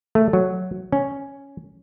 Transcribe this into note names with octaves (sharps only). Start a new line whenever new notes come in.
A3
F#3
C#4